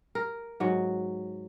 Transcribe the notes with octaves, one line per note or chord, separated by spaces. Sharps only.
A#4
G#2 F#3